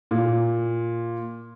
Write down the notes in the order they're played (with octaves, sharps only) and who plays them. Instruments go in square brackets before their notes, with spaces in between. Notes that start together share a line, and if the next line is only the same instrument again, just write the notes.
[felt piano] A#2